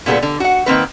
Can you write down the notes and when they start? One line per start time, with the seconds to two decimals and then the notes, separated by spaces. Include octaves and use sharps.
0.06 A#2 D3 G3 B3 G#4 A4
0.23 D3
0.40 F#4 F#5
0.66 D#3 A#3 C4 B4